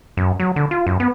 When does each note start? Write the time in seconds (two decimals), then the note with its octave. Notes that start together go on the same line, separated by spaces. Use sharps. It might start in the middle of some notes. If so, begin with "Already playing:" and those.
0.17 F#2
0.40 F#3
0.56 D3
0.71 F4
0.87 F#2
1.00 B3